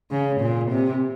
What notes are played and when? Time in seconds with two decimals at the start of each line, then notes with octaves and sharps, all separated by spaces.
0.11 C#3
0.41 A#2
0.71 C3